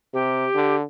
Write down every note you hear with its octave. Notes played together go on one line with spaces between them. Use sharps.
C3 G4
D3